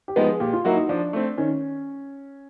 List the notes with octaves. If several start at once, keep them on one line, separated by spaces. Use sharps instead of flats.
G4
F3 G#3 B3 D#4
G#4
A#2 G4
F4
F#3 A#3 D#4 E4 F#4
D#4
F3 D4
A3 C4
D#3 C#4